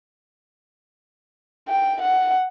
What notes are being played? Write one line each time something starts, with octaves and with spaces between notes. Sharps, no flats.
G5
F#5